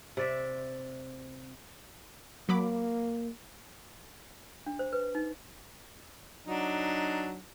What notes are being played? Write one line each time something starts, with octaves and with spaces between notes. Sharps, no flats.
C3 D5 E5
F#3 A#3 B5 D6
D4
C5
B4
D#4
F#3 D4 D#4